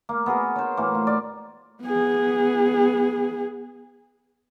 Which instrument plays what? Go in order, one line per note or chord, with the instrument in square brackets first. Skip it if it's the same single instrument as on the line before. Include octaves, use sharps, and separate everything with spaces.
[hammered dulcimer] A#3
B3 F#4 G#4 A#4
C5 C#5
A2 E3 A#3
F4
D5
[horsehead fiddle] B3 G#4